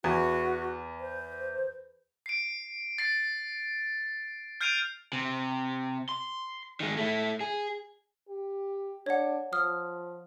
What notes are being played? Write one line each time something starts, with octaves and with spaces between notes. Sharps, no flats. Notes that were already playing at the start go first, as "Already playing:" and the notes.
E2 F#4
C5
C7 D7
A6 C7
F6 G6 C7 D7 D#7 F7
C3
C6
D#3 G#3
A3 E4
G#4
G4
D4 C#5 F#5
F3 D#6 F6